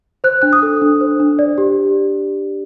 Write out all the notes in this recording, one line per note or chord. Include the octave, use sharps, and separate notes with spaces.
C5 F#6
D4 F#6
D#6
A4
D4
C5
D4
D5
G4